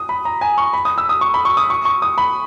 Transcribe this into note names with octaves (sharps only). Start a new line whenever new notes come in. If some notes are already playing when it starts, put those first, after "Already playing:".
Already playing: D#6
B5
A#5
G#5
C#6
B5
D#6
E6
D#6
C#6
B5
C#6
D#6
C#6
C#6
D#6
B5